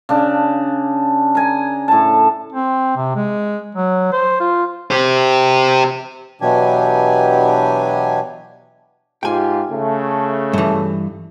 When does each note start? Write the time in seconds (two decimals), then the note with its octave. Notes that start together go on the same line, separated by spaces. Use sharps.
0.09 C#3 D4
1.35 G#5 A#5
1.88 A2 A5
2.53 C4
2.97 C3
3.15 G#3
3.75 F#3
4.12 C5
4.40 F4
4.91 G4 C5
6.41 B2 E3 F#3 D4 G4 G#5
9.23 G#2 F4 G4 G5 G#5
9.71 C#3 A3
10.53 G2 E3